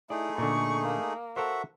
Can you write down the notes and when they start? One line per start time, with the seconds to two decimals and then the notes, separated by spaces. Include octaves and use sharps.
0.10 A3 D#4 E4 G#4 D5
0.38 A#2 D3 C#6
0.87 A#3
1.36 F#4 A4 A#4 C5 E5 F#5